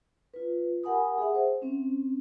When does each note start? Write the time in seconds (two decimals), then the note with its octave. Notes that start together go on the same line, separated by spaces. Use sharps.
0.34 F4 B4
0.84 G4 A#4 F#5 G#5 B5 D#6
1.18 G#4 E5 F#5
1.35 C5
1.62 C4 C#4